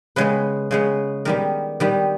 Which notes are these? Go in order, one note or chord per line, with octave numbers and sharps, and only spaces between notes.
C#3 G#3 B3 B4
C#3 G#3 B3
D#3 G3 B3 A#4
D#3 G3 B3